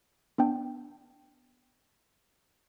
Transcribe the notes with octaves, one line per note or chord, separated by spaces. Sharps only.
B3 D4 G5